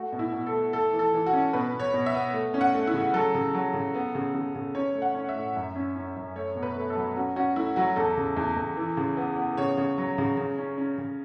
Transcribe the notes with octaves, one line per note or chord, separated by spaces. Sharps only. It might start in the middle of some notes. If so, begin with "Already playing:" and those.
Already playing: A3 F#4
B2
E4
B2
A4
A3
A3 A4
E3
A4
E3
F#4
C#4
B2 B4
B2
C#5
B2
E5
B3
A3
C#4
F#5
A3
E4
C#3
F#3 A4
C#3
F#3
C#3
B3
C#3
C#3
C#3
C#4 C#5
A3
F#5
C#4
E5
A2
F#2
C#4
C#4
F#2
A3 C#5
B2
B4
A3
A4
F#3
C#4 F#4
C#4 F#4
A3 E4
F#3 F#4
E2 A4
C#3
E2
E2
E3
C#3
B3
B3
C#3 C#5
C#3
F#3
C#3
C#3
C#4
C#4
C#3